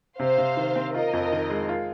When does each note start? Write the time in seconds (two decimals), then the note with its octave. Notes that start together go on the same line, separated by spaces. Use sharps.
0.19 C3 C5 F5
0.38 C3
0.57 D#3
0.76 C4
0.94 F4 A#4 D#5
1.13 F2
1.32 D#3
1.50 G#3
1.69 F4